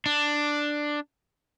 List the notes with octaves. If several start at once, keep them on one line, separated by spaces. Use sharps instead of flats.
D4